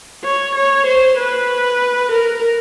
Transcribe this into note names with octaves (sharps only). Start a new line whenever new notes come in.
C#5
C#5
C5
B4
A#4